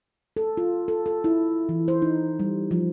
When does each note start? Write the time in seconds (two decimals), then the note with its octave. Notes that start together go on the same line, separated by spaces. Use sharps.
0.37 A4
0.57 F4
0.88 A4
1.06 A4
1.24 E4
1.69 E3
1.88 C5
2.02 D#4
2.40 G3
2.71 F3